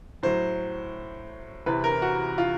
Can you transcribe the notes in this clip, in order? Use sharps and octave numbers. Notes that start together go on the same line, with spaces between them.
A2 F#3 C5
E2 C3 E3 B4
A#4
F#4
F4